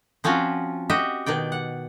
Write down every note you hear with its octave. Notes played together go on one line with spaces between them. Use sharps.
F3 C4 C#4 F4 F#4
F#4 G4 D#5 E5
B2 D#3 D5 G5
F#5